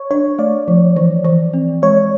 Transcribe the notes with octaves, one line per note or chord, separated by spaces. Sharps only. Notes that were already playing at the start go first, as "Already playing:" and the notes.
Already playing: C#5
D4 C#5
A3 D5
F3
E3
E3
C4
G#3 C#5